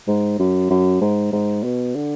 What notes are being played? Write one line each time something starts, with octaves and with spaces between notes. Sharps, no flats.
G#2
F#2
F#2
G#2
G#2
B2
D3